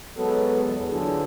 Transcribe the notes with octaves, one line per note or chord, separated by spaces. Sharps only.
F#3 G#3 B3 A4
E2
D3 E3 F#3 F4 G#4 A4